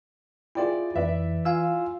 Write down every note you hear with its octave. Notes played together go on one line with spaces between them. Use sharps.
E4 F4 G#4 D5 G5
F2 E3 B4 D5 E5
F4 F5 G#5 E6